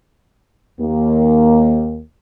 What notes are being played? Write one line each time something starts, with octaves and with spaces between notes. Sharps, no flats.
D#2 A#3